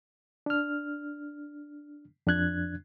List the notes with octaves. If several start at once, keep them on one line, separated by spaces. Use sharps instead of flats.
D4 F6
F2 D4 F#6 G#6